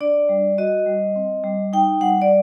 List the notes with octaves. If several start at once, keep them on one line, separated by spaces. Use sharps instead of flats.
D4 D5
G3
F#4 D#5
G3
C4
G3
D#4 G5
G3 F#5
D5